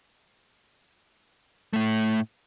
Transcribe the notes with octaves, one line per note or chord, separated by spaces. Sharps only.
A2 A3